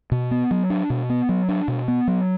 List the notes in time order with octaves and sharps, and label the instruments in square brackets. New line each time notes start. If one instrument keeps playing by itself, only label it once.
[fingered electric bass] B2
B3
F#3
D4
B2
B3
F#3
D4
B2
B3
F#3